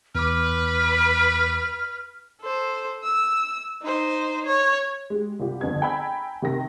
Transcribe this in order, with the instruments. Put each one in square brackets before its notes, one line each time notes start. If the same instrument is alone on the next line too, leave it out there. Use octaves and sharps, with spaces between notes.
[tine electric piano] E2 D6 [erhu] B4 [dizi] F6
[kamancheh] A4 C5
E6
D#4 C5
C#5
[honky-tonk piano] G#3 G4
C2 F4 G4
G1 F2 B3 G#6
G5 G#5 A#5 B5 E6 G#6
C3 D#3 A#6